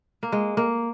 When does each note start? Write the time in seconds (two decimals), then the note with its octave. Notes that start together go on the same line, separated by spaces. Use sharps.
0.23 A#3
0.32 G#3
0.57 A#3